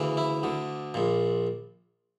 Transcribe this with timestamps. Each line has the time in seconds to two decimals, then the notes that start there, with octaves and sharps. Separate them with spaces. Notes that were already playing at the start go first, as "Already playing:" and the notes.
Already playing: D2 C#3 E3
0.17 E4
0.43 D2 D3
0.94 A#1 A#2